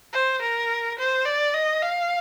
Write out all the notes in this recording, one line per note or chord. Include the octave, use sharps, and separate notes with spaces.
C5
A#4
C5
D5
D#5
F5